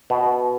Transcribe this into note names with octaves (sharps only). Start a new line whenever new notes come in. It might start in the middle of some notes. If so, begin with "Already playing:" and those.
B2